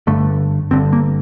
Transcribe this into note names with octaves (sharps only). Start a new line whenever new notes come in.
G1 G2 D3 A3
G1 G2 D3 C4
A#3